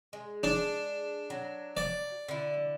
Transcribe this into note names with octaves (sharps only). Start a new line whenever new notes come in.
G#3
D4
F#3
D5
D3 E4